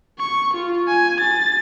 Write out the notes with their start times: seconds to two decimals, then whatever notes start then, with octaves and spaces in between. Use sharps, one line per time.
0.19 C#6
0.54 F4
0.88 G#5
1.21 A6